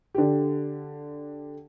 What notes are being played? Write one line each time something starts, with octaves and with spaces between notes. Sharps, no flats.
D3 G4